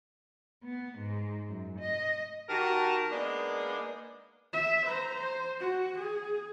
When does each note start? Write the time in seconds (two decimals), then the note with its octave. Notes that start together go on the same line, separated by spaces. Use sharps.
0.63 B3
0.99 G#2
1.48 F#2
1.79 D#5
2.50 D#3 F#4 G4 A#4 A5 A#5
3.11 G#3 A#3 B3 D4 D#4 G#4
4.53 E5
4.86 C5 A#5
5.15 C5
5.60 F#4
5.99 G#4